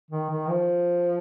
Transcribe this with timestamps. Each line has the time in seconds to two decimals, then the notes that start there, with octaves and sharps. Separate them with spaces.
0.11 D#3
0.30 D#3
0.49 F3